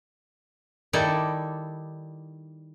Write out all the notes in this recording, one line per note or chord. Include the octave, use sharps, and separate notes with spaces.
D#3 G3 D#4 E4 A4 D5